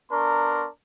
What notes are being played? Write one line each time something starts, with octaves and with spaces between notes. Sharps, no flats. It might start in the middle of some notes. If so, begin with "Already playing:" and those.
B3 D4 A#4 A#5 C6 C#6